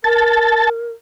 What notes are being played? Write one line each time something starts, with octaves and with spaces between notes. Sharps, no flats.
A#4 A5